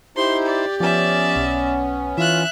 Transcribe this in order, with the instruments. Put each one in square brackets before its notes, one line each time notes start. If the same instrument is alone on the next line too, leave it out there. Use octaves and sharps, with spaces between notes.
[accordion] D#4 E4 C5 [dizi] G4 [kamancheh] C6
[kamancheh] D5
[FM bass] F3 [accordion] B3 C#4 [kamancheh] D5 E5
[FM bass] B1
[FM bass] E3 [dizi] F4 [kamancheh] E5 F#6